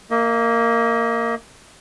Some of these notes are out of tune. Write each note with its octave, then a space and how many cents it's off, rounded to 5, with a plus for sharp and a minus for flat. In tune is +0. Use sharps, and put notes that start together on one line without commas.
A#3 -10 D#5 +30